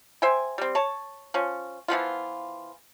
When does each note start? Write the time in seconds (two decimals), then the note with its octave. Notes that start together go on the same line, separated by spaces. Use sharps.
0.22 C5 E5 G5 G#5
0.58 G3 C4
0.75 C#5 A5
1.34 F3 C#4
1.88 E3 F3 B3 F4